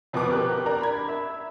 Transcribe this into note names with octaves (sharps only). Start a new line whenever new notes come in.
F2 B2 B3 B4 D6
C#4 G4 A#4 F#6
D4 A#4 D5 A#5
B5 G#6
E5